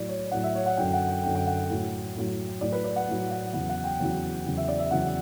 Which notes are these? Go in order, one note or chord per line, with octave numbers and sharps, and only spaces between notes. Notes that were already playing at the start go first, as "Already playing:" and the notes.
Already playing: A2 F#3 D5
C#5
A2 F#3 F#5
E5
C#5
F#5
F#2 D3 F#3 G5
F#5
G5
F#2 D3 F#3 G5
G5
F#5
A2 F#3
A2 F#3
A2 F#3 D5
B4
D5
F#5
A2 F#3
F#5
E2 C#3 F#3 F#5
F#5
G5
E2 C#3 F#3
E2 C#3 F#3
E5
D5
E5
E2 C#3 F#3 F#5